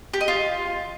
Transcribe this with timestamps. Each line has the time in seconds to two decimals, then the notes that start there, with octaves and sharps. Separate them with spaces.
0.14 G4
0.21 D#5
0.28 F4